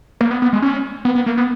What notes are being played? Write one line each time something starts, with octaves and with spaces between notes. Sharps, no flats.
A#3
B3
B3
G#3
C#4
B3
B3
A#3
B3